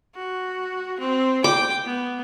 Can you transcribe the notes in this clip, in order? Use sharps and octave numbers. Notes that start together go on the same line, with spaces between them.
F#4
C4
G5 D6
B3